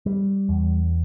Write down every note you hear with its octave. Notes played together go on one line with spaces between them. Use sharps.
G3
E2